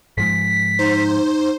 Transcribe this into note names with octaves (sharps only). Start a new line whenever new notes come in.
G#2 F3 G#3 B6
D#4 C5